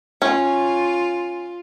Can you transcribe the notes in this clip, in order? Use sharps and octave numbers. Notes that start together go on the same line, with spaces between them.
C#4 F4